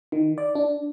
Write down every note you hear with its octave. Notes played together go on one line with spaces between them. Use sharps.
D#3
D5
D4